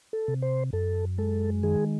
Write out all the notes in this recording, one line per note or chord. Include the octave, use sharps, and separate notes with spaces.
A4
C3
C5
F#2 A4
G#3 A4
D#3 G#4